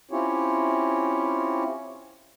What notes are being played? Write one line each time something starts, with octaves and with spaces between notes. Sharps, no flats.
C4 C#4 E4 F4 G4 C#5